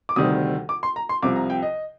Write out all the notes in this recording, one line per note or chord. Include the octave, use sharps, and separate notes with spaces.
D6
D2 C3 D#3 G3 D#6
D6
C6
A#5
C6
C2 C3 F3 D6
A#5
G5
D#5